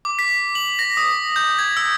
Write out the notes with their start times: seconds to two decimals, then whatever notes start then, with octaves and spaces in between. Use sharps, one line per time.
0.05 D6
0.19 B6
0.55 F#7
0.79 A#6
0.97 D#6
1.36 G6
1.59 G#6
1.77 E6